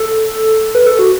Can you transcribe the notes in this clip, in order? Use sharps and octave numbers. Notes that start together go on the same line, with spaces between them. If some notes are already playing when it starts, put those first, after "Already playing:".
Already playing: A4
B4
A4
F#4